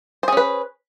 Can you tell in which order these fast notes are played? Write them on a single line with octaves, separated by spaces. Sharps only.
C5 G#4 C#4 B4